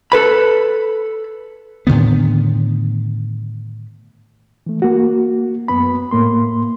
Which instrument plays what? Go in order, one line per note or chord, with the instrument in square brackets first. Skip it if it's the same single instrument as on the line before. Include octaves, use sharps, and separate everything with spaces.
[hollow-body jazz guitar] A4 B4 B5
[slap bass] A2 D3 D#3 B3
[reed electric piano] E3 A3
A#3 F#4
F#2 B3 B5
A2 A#3 C6